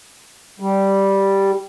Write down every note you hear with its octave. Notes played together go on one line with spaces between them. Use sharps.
G3